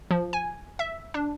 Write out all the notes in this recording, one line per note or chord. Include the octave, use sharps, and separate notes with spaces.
F3
G#5
E5
D4